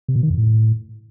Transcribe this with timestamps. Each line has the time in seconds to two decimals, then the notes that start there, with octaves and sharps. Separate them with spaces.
0.08 C3
0.16 B2
0.23 D#3
0.30 F2
0.37 A2